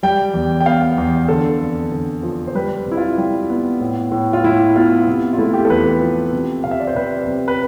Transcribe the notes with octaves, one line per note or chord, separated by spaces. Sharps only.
G3 G5
E2
G5
B3 F5
E2
D3 A4
F2
D3
F3
C5
G3 B4
C3
E4
F4
G3
B3
A2
A2
F4
A2 E4
B3 F4
C3
F4
A3 E4
G4
A4
E2 B4
F3
C3
C3 F5
E5
D5
C5
C3 B4
C3
B4